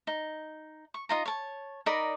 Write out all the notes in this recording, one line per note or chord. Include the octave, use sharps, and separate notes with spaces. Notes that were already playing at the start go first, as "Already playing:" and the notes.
D#4
C#6
D#4 F4 A#5
C#5 A5
D#4 A#4 D5 B5